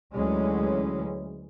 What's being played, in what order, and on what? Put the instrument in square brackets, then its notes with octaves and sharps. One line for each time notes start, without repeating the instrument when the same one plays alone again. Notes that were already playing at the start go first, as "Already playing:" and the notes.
[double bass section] D2 E3 F#3 G#3 C#4